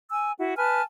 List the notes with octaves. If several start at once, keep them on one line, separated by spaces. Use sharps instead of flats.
G#5 E6
E4 F#4
B4 G#5 A5 F6